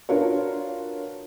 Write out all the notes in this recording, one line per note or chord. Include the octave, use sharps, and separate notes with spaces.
D4 F4 F#4 A#4 B4 C#5